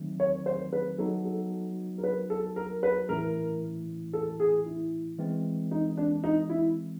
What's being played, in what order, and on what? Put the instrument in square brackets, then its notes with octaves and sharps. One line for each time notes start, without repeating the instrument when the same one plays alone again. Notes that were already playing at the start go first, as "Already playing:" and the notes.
Already playing: [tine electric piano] D#3 F#3 A3 C4 D#4
[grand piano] C#5
C5
B4
[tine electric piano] F#3 B3 D#4 F#4 [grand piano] A4
[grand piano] A4
A#4
B4
A4
A#4
B4
[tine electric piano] A2 E3 A3 C#4 E4 [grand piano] A#4
[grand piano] A4
G#4
E4
[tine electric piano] E3 G#3 C4
[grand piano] D#4
D4
D#4
E4